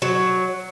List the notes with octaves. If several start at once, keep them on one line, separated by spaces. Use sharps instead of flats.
F#3